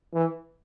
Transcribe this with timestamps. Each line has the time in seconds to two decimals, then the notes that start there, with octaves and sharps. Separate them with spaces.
0.13 E3